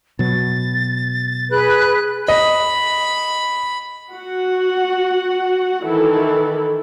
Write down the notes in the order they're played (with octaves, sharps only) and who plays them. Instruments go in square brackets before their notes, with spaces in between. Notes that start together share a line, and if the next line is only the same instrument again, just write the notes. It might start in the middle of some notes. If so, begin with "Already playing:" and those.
[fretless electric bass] B2 F#3 [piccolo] A6
[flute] G#4 [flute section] B4 [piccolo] F#6
[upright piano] D#5 [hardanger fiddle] B5
[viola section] F#4 F#5
D#3 E3 E4 A4